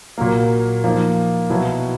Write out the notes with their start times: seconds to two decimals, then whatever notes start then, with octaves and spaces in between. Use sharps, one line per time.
0.18 A#2 F#3 A#3
0.84 F3 A#3 D#4
1.50 B2 F#3 B3 E4